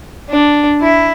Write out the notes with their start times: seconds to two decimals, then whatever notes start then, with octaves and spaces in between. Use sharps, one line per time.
0.30 D4
0.81 E4